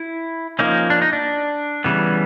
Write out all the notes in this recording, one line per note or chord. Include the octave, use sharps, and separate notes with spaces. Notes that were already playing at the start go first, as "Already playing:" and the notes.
Already playing: E4
F3 A#3 C#4 D#4
D4
D#4
D4
C#3 E3 G3 B3